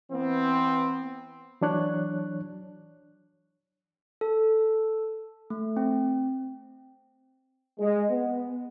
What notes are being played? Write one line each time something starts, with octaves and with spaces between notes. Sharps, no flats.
E3 B3 C4
E3 F#3 D4 C#5 F#6
A4
A3
C4
G#3
B3